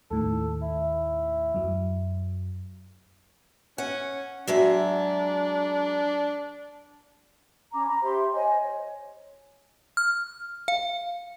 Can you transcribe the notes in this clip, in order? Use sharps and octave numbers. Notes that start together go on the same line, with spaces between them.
D#2 A2 D#3 A4
E4
F#2 F#3
C#4 F#5
F#3 G#3 D4 E5
C#4 A#5 D6
A#5 B5
G4 C5 E5 C6
C5 C#5 D#5 G#5
C#5
F6
F5